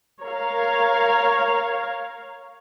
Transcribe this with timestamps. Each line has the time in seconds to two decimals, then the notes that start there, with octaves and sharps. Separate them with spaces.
0.22 A#4 C#5 F5